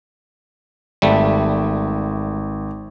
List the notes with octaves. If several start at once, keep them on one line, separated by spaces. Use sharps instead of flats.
G#1 G3 A3